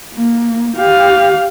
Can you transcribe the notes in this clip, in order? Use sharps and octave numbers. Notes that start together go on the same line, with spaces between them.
A#3
G4 F5